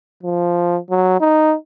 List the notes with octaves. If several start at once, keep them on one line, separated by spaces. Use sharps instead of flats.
F3
F#3
D#4